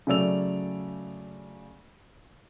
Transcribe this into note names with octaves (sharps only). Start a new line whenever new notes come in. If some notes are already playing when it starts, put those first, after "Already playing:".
C#3 F#3 A3 D5 E6 F7